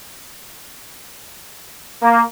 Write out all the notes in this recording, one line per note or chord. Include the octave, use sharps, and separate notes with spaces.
A#3